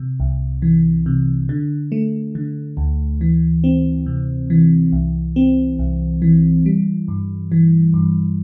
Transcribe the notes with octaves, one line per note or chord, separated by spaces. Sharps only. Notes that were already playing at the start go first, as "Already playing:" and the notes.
Already playing: C3
C2
E3
C3
D3
A3
D3
D2
E3
C4
C3
E3
C2
C4
C2
E3
G3
G2
E3
G2